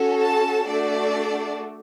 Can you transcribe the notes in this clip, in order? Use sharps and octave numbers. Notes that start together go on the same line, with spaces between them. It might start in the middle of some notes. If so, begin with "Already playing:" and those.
Already playing: C#4 F#4 A4
A5
A3 D4 F#4 A4 D5